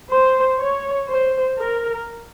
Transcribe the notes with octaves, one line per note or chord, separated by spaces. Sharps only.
C5
C#5
C5
A#4